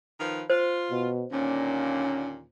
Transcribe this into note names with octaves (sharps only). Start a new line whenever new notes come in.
D#3 F3 B4
F4 C5
B2
D#2 A#2 D3 C#4